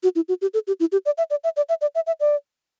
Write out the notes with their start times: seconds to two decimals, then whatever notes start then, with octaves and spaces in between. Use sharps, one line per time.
0.03 F#4
0.16 E4
0.29 F#4
0.42 G4
0.54 A4
0.67 G4
0.80 E4
0.92 G4
1.06 D5
1.18 E5
1.30 D5
1.44 E5
1.57 D5
1.69 E5
1.81 D5
1.95 E5
2.07 E5
2.20 D5